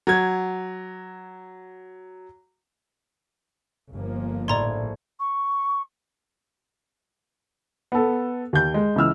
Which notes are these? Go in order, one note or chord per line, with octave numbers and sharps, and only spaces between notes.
F#3 G#6
G1 F3 A#3
A#1 A2 D5 A#5 C6 G#6
C#6
B3 A4
D#2 G6
G#3
C#2 E3 E6 F6